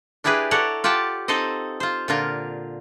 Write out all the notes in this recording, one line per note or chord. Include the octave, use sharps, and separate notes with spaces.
D4 E4 G4 G#4 B4
A4 C#5 D5 F#5 A#5
F4 G4 F#5 G5 A5
C4 D#4 A4 C5 D#5
F4 C5
A#2 D3 F4 A#4